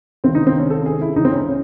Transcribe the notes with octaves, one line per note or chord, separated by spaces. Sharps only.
C#2 C3 D#3 C4
D#4
C4
C#4
A4
G#4
E4
C#2 C#3 E3 D#4
C4
C#4
C#4